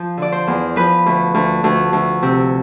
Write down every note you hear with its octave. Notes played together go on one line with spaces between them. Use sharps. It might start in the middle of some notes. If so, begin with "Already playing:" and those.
Already playing: F3
D3 D5
C5
E2
F3 B4
D2
D2
D2
D2
C3